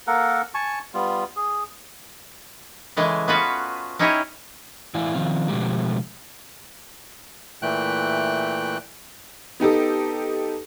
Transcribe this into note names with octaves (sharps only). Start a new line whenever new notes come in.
A#3 A4 A#4 F#5
G#5 A5 C#6
G3 B3 F4
G#4
C#3 E3 G#3 A3
B3 C#4 F4 F#4 B4
C#4 D#4 E4 G4 C#5 D#5
A2 E3 E4 D5 F5 G#5
D#3 F3 C4 F5
B2 D3 F3 G#3 A3 G4
A#2 E3 A3 G5 F#6
B3 D#4 G4 A4